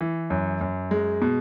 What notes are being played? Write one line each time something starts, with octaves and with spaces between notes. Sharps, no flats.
E3
F#2
F#2
G#3
B2